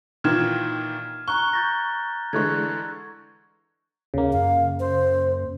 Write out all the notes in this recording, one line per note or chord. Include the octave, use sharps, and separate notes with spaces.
A#2 D#3 E3 F6 G#6 E7
A#5 C#6 F#6 G7
G6 A6 A#6
D3 E3 G#3 C#6 F#6 G#6
D#2 C#3 A#3
F#2 F5
C5